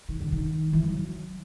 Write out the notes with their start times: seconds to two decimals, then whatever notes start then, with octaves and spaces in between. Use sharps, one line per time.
0.09 D#3
0.21 D3
0.32 D#3
0.73 E3
0.89 F#3